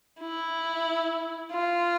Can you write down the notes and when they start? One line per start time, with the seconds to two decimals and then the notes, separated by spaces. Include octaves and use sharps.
0.20 E4
1.51 F4